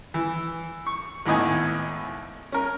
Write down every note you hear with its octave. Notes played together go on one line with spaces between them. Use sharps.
E3
C#6
G#1 D#2 A2 B3 D#5 G#5
C#4 A#4